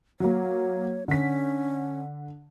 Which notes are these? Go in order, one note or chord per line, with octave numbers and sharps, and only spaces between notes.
F#3 A#3 C#5
D3 C#4 B6